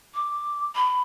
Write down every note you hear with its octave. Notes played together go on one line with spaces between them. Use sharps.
D6
B5